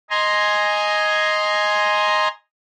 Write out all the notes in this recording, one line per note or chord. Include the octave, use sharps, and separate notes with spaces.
D#5 G#5 A#5 C6